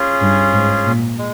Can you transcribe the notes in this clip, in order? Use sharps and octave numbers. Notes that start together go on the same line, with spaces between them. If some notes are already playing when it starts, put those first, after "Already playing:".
Already playing: C#4 F4 G#4
G2
G#2
A#2
G#3